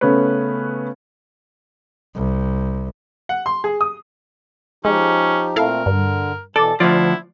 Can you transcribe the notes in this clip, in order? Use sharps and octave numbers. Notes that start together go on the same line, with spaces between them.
C#3 A3 B3 C#4 B4
C2
F#5
C6
G#4
D#6
F3 G#3 C#4 D#4 G4
A#2 A3 C4 E4 A4 A#4 F5
G2 D3
B2 E3 A4 D5
D2 F3 D4 E4 D5 F#5